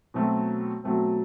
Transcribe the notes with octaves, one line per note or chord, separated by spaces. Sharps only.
B2 F#3 A3 C4
B2 F#3 A3 C4